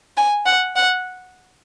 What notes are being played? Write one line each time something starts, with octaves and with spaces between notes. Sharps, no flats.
G#5
F#5
F#5